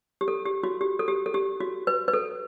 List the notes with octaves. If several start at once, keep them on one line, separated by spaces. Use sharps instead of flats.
G4
A4
G4
F#4
G4
A4
G4
A4
G4
F#4
B4
B4
A4